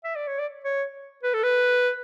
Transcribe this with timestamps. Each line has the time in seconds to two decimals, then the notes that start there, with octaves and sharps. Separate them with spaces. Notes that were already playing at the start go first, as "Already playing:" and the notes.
0.04 E5
0.16 D5
0.27 C#5
0.39 D5
0.65 C#5
1.23 B4
1.34 A4
1.43 B4